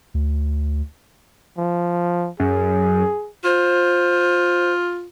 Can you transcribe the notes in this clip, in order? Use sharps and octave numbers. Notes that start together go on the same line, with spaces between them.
D2
F3
F#2 G#4
F4 C5